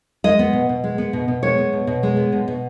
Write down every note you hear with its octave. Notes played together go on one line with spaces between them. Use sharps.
G#3 D#5
B3
B2
B2
G#3
B3
B2
B2
G#3 C#5
B3
B2
B2
G#3
B3
B2
B2